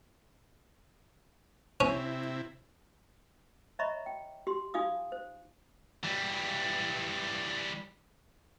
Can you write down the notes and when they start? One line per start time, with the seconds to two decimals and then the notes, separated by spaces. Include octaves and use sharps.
1.80 C3 C#4 E4
3.79 C#5 D#5 E5 A#5 B5 C#6
4.06 G5
4.47 G4 C6
4.74 D#4 F4 F5 G#5 D6 D#6
5.12 C5
6.04 E3 G3